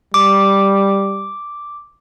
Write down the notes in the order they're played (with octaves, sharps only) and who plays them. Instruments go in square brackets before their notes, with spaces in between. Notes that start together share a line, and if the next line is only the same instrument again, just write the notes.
[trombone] G3 [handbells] D6